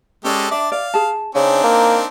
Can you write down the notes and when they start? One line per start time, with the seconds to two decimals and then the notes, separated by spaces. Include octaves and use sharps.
0.24 G#3 C#4 G4 A4 D5
0.51 D4 D5 E5
0.72 D5 F5
0.94 G#4 A5
1.35 C#3 C4 D4 D#4 G#5
1.63 A#3